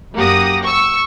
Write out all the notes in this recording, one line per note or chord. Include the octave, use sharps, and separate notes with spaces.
F#2 A#3 G4 F#5 D#6 A#6
C#6 E6